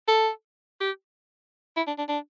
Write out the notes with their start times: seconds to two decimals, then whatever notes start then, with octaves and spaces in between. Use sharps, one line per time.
0.08 A4
0.81 G4
1.77 E4
1.88 D4
1.98 D4
2.09 D4